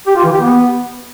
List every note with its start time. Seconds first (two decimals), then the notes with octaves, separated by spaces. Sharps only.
0.07 G4
0.15 F4
0.24 E3
0.32 G4
0.41 B3